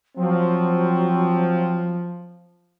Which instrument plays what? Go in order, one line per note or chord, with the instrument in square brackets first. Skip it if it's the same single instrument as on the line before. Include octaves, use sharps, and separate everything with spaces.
[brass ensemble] F3 [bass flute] F#3 [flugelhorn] C4